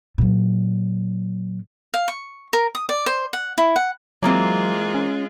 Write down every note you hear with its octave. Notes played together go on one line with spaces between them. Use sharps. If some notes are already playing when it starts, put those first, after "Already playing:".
A#2 F#3
F5
C#6
A#4
D#6
D5
C5
F#5
E4
F#5
E3 F#3 G#3 A#3 C4 F4
C#4